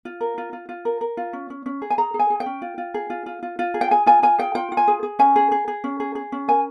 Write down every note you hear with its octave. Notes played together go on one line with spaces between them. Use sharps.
F4
A#4
F4
F4
F4
A#4
A#4
F4
C#4
C#4
C#4
G#4
G#5
G#4 A#5
G#4
G#5
G#4
G5
C#4
F4
F4
G#4
F4
F4
F4
F4
G#4
G5
G#4 G#5
F4 G#5
F4 G#5
G#4 G5
F4 G5
F4
G#5
G#4
G#4
C#4 G#5
G#4
G#4
G#4
C#4
G#4
G#4
C#4
A#4 G#5